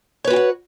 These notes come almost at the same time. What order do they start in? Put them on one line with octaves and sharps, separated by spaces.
C#5 B4 F#4 G5 F#5